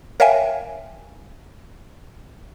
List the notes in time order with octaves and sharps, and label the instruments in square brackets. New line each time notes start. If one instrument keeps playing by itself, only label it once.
[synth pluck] A#4 C#5 E5 F5 G5 G#5